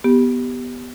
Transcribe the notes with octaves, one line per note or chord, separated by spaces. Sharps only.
B3 G4